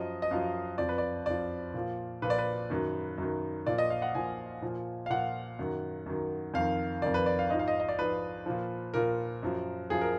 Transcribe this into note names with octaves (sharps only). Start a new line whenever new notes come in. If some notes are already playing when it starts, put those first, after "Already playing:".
Already playing: F#2 F3 D#5
D#5
F#2 F3 F5
F2 F3 D5
B4
D5
F2 F3 D5
A#2 F3
A#2 F3 B4
D5
B4
F#2 D#3
F#2 D#3
A#2 F3 D5
D#5
F5
F#5
A#2 F3 G#5
A#2 F3
F5
A#2 F3 F#5
F#2 D#3
F#2 D#3
F2 D#3 F5
F2 D#3 D5
B4
D5
F5
G#2 F3 D#5
F5
D#5
D#5
D5
G#2 F3 B4
A#2 F3
A#2 F3 A#4
F#2 F3
F#2 F3 G#4
A#4